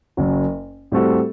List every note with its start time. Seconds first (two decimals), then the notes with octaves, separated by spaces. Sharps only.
0.17 F#1 F#2 F#3
0.92 A2 G3 C4 F#4 A4